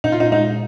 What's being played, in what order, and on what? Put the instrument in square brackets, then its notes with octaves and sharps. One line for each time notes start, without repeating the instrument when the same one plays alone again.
[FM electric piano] A#2 [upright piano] D#4
[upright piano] F4
D#4
[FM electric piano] G#3 [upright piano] D#4